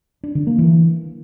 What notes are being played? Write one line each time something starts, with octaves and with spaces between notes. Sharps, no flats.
D4
D3
A#3
E3